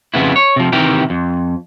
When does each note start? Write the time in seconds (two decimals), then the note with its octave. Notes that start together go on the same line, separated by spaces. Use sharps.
0.14 F2 C#3 B3 E4
0.36 C#5
0.56 C3 F3
0.73 C3 D#3 E3 G4 A#4
1.10 F2